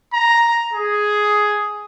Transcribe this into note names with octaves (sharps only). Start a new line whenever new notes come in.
A#5
G#4